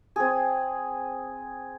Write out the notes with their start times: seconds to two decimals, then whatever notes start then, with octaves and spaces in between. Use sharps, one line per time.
0.16 C4 G#4